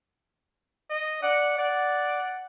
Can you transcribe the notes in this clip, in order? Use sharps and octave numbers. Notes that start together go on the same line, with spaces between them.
D#5
D5 F#5
D5 F#5